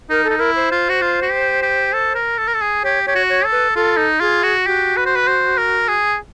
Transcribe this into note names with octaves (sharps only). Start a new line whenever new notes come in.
D#4 A#4
A4
D#4
E4 A#4
C5
F4
F#4
F4
F#4
G4
G4
A4
A#4
A4
A#4
A4
G#4
G4 C#5
G4 C#5
F#4
C#5
A4
B4
F4 A4
D#4
F4 G#4
F#4
F#4 G4
B4
C5
B4
C5
A#4
G#4